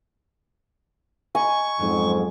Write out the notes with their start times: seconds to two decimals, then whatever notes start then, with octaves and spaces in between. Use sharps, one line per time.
1.35 D#5 G#5 A#5 B5 C#6
1.79 F2 G#2 F#3 C#4